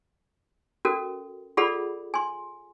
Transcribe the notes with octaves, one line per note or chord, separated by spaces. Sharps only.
C#4 F#4 A4 A#4
F4 G#4 A4 D5 F#5 B5
G#5 C6